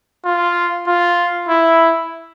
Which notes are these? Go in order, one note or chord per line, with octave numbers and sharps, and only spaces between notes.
F4
F4
E4